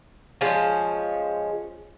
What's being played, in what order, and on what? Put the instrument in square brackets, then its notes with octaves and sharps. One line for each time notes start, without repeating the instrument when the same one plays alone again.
[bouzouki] F3 G#3 C#4